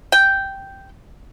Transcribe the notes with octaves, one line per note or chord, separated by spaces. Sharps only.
G5